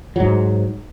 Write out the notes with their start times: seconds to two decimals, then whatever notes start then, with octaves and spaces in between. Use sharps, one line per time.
0.16 G#2 F#3